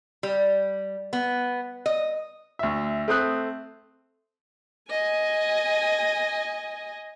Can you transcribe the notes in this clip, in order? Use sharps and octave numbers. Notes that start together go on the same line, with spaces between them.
G3
B3
D#5
D2 E5
A3 C4 D#6 F#6
D#5 G#5